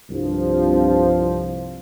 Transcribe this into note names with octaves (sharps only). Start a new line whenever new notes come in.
C2 G2 F3